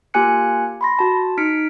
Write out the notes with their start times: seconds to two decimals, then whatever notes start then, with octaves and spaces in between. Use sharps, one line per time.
0.14 A#3 F4 G4 G#5 F#6 C#7
0.81 B5 C6 A#6
0.99 F#4 A5
1.37 D#4 F6 B6 C#7 D7